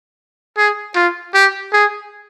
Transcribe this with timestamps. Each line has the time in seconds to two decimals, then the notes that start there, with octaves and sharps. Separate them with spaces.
0.58 G#4
0.96 F4
1.34 G4
1.73 G#4